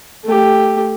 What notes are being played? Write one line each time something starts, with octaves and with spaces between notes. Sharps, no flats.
A3 G4